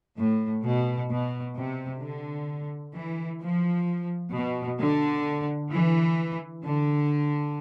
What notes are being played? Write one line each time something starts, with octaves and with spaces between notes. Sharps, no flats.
A2
B2
B2
C3
D3
E3
F3
B2
D3
E3
D3